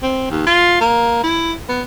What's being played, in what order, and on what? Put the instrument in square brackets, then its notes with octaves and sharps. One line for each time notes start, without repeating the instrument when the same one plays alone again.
[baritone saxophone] C4
D#2
F4
A#3
E4
B3